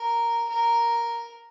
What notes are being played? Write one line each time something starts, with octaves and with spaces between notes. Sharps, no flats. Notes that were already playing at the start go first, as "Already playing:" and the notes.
Already playing: A#4
A#4